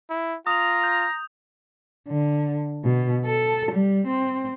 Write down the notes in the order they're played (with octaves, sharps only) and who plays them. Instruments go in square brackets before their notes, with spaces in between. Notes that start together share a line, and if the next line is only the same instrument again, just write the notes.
[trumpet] E4
[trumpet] F4 [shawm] A#5 [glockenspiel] D#6 F7
[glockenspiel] G6
[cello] D3
B2
A4
G3
C4